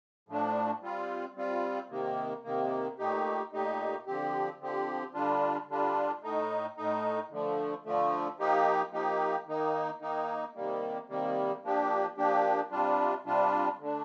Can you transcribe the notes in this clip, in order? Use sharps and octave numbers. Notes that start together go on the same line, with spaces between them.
A2 F3 A3 D4
G3 C4 F4
G3 C4 F4
C3 D#3 A#3
C3 D#3 A#3
A#2 A3 D#4 G4
A#2 A3 D#4 G4
D3 F3 C4 G4
D3 F3 C4 G4
D3 G3 D4 F4
D3 G3 D4 F4
A2 A3 D#4
A2 A3 D#4
D3 F3 A3
D3 F3 A3
F3 A#3 D#4 G4
F3 A#3 D#4 G4
D#3 A#3 D#4
D#3 A#3 D#4
C3 D#3 G3 A#3
C3 D#3 G3 A#3
F3 A#3 D4 G4
F3 A#3 D4 G4
C3 G3 D4 F4
C3 G3 D4 F4
D3 A3 D4